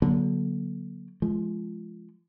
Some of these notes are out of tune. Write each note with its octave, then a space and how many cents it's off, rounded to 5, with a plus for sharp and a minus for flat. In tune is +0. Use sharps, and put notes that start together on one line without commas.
D3 -20 F#3 +0 A#3 +35
F3 -20 G#3 +15